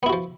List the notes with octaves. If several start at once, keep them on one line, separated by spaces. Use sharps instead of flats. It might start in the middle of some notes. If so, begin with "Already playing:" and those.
F3 B3 E4 F#4